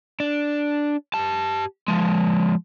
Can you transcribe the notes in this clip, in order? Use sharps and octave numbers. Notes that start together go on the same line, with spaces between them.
D4
G4 A5
F3 G#3